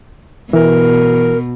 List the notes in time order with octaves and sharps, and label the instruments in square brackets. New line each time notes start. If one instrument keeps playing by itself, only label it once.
[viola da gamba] B2 [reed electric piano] E3 [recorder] A#4